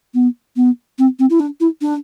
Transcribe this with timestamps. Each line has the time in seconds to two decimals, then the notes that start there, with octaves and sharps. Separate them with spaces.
0.14 B3
0.56 B3
0.98 C4
1.19 C4
1.29 E4
1.39 D4
1.60 E4
1.81 D4